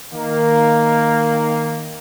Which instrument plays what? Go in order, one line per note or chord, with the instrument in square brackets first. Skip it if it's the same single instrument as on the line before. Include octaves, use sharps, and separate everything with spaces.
[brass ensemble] D#3 A#3